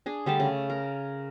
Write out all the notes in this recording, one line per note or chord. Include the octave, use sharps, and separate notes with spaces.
D4 G#4
D3 G3 A3 A5
C#3
A#4